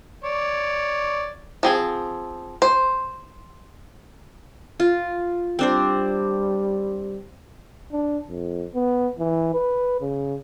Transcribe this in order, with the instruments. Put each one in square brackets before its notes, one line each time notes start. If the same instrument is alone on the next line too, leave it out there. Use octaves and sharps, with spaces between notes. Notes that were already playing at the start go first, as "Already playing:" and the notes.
[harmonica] C#5 D5
[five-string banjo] F3 C4 G#4
C5
[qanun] F4
[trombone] G3 [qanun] C4 D4 C5
[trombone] D4
F2
B3
E3
B4
C#3